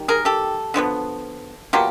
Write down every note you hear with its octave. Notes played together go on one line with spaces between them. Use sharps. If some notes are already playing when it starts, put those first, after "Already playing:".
Already playing: D#3 G3
G#4 A#4
G4 A4
D3 F3 G#3 B3
B2 F#3 A#3 F4 G4